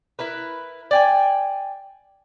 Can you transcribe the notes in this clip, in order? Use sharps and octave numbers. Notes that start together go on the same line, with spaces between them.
E4 A#4 B4
D5 G5 G#5